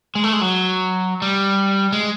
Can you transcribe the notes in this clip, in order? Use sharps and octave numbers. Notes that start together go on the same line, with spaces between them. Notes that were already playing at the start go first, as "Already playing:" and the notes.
G#3
A3
G#3
F#3
G3
G#3